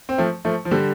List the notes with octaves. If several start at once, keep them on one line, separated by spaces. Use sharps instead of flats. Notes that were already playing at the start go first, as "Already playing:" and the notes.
C4
F3 A3
F3 A3
F3
D3 G3